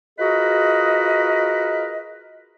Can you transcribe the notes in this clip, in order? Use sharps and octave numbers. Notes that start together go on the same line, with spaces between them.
F4 F#4 G#4 A#4 B4 D#5